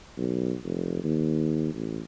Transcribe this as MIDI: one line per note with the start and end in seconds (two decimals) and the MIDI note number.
0.17 0.54 35
0.64 1.01 29
1.04 1.72 39
1.74 2.00 33